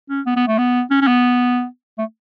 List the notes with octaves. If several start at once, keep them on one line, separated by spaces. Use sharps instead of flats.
C#4
B3
B3
A3
B3
C#4
C#4
B3
A3